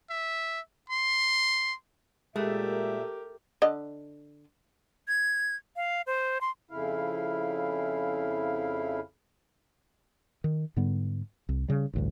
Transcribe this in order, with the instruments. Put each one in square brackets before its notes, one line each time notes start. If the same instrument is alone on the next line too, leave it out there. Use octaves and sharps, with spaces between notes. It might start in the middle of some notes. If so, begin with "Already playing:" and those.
[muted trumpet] E5
C6
[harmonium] A#2 E5 [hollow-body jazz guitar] G#3 [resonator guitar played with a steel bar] A3 [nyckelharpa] G4 A#4
[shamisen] D3 D#5
[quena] G#6
F5
C5
C6
[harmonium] F2 C#3 E4 F5
[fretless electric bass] D#3
G#2 D3 G3 B3
C2
C#3 G3
A1 D2 G2